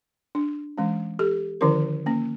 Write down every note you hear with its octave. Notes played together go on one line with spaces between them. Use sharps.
D4
E3 G#3 C#4
G4 A4
D3 D#3 F3 C#4 E4 A#4
A#3 C#4